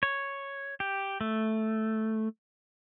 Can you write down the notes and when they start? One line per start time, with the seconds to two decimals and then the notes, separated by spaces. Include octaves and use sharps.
0.03 C#5
0.80 G4
1.21 A3